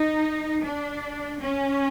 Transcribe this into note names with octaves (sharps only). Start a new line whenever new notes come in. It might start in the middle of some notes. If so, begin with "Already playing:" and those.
Already playing: D#4
D4
C#4